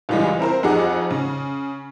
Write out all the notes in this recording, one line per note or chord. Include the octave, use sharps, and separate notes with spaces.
C#2 A#2 E3 G3 G#3
C4 E4 A#4 C5
F2 D#4 G#4 F#5 D6
C#3